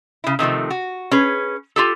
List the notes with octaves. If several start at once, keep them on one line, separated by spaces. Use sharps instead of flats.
C#3 E4
C3 D#3 F3 A3
F#4
C#4 G#4 B4
F4 G4 A4